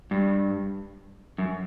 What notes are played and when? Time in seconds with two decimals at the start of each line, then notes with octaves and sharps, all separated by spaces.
0.11 G2
1.38 F#2